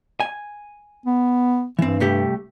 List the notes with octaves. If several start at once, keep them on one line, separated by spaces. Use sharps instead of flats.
G#5
B3
G2 E3 C4
C2 A3 G4